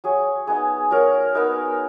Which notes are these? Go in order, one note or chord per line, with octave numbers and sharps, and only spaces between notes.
F#3 G#4
B3 D#4 G#4
F#3 A#4
B3 D#4 A#4